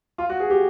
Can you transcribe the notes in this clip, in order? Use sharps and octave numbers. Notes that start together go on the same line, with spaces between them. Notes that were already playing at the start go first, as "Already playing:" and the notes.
F4
F#4
G#4
G4